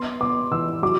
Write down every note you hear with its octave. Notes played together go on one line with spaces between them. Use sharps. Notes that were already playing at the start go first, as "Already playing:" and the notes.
Already playing: B3 C6
B3 D6
E3 E6
F#3 D6